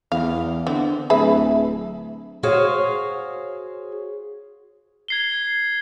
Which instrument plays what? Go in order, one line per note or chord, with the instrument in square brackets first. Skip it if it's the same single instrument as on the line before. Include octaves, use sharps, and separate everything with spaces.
[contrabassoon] E2 [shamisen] F5
[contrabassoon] D3 [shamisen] B3 C4
[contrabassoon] D1 [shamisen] G#4 B4 E5
[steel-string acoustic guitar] F#4 G#4 C5 C#5 F5
[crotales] G#6 C7 G7